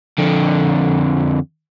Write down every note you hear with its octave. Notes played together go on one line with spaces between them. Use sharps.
F2 D3